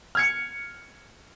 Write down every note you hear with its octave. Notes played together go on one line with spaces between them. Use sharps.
F6 G#6 C#7